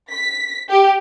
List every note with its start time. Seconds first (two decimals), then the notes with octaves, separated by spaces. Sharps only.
0.11 B6
0.69 G4